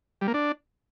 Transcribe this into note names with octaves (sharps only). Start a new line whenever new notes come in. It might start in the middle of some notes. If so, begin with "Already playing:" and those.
G3
A#3
D4